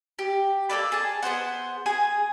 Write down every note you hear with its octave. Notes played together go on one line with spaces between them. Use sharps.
G4
A#3 A4 B4 D5
G#4 A5
B3 G#4 C5 F#5
G#4 G#5 D#6